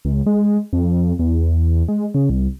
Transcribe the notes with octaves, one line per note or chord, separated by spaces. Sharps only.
C#2
G#3
F2
E2
G#3
C#3
C2